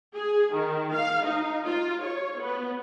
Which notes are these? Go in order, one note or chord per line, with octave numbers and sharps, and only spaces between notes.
G#4
D#3
F5
D#4
F4
C#5
B3